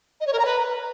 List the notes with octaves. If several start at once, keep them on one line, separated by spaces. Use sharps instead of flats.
D#5
C#5
A#4
A#5
B4